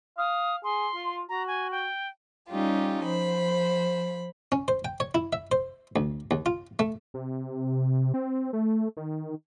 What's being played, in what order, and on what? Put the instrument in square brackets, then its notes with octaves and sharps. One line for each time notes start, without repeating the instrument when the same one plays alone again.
[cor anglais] F5 [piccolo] D#6
[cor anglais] G#4 [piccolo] C6
[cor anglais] F4
[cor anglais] F#4 [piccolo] A#5
[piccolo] G#5
G5
[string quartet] G3 C#4 D#4 F4 G4
F3 C5 B5
[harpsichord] C#4
C5
G5
C#5
E4
E5
C5
D2
D#2
F4
A3
[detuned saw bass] C3
C4
A3
D#3